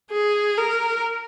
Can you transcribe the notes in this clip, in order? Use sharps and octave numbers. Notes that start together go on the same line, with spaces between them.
G#4
A#4